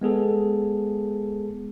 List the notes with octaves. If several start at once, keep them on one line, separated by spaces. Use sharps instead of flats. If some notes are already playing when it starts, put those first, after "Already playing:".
G#3 B3 G#4 A4